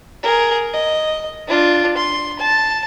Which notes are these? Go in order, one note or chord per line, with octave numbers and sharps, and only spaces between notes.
G#4 A#4
D#5
D4 F4
C6
A5